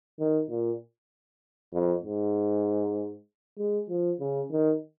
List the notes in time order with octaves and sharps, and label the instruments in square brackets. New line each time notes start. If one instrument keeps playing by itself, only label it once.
[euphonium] D#3
A#2
F2
G#2
G#3
F3
C#3
D#3